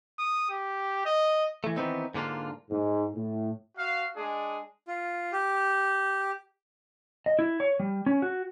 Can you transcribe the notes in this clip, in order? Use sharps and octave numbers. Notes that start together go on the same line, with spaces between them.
D#6
G4
D#5
E3 A3
D#3 E3 A3 B3 C4 D#4
G#2 D3 A#3 D4 F4
G#2
A2
F#4 F5
G#3 D4 G#4
F4
G4
D#5
E4
C#5
G3
C#4
F#4